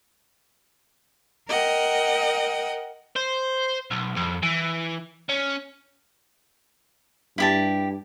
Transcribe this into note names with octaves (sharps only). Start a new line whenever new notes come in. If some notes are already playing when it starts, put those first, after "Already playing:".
A#4 D#5 F#5 G5
C5
B1
F2
E3
C#4
G2 E4 G4 A5